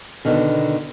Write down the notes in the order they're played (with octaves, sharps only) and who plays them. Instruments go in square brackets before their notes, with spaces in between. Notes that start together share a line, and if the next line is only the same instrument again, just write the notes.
[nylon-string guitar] B2 D3 D#3